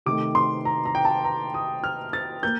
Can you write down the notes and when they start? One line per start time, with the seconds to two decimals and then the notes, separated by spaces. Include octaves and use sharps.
0.06 C3 D#3 A3 D6
0.35 C6
0.65 A#5
0.85 A#5
0.95 G5
1.05 A5
1.24 A#5
1.54 D#6
1.84 F6
2.13 A6
2.43 A#3 G6